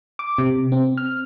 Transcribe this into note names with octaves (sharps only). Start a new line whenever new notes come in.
D6
C3
C4
F6